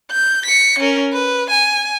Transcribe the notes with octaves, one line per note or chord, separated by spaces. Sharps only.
G6
B6 C#7
C#4 A#4
B4
G#5